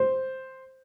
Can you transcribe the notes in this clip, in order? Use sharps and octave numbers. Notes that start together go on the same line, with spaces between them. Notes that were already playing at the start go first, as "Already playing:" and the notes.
Already playing: C5